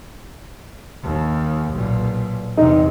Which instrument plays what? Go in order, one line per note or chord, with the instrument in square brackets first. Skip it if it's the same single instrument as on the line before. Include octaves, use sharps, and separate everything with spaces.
[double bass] D#2
B1 A#2
[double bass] E2 C3 [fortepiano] D#4